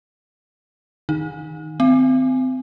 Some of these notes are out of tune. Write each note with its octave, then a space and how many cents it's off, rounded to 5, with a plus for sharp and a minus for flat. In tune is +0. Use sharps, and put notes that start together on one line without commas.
D#3 +0 D#4 +0
C4 -25 G#5 +0